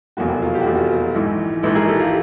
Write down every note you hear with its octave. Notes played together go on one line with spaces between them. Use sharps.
F1 E2 B2 F#3 A#3 F#4
F#4
F4
G4
F#4
F1 E2 B2 F#3 A#3 F4
F#4
A#1 G#2 E3
A#1 G#2 E3 A4 B4
G#4 A#4
G4 A4
F4 G4